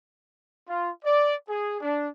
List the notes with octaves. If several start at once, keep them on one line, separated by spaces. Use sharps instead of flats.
F4
D5
G#4
D4